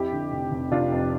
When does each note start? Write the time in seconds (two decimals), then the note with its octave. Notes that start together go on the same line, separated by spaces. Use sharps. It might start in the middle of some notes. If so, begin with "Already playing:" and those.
Already playing: F2 E4 G4
0.12 D3
0.32 F1
0.52 F1
0.72 F1 D4 F4
0.92 F2